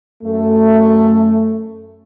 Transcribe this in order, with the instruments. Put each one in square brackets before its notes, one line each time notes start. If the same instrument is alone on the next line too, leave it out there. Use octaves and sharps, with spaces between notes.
[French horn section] F#2 A3